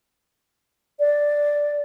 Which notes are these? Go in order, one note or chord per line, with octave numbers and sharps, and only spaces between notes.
D5